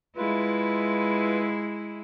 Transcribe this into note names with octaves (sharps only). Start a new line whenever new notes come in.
G#3 E4 F4 B4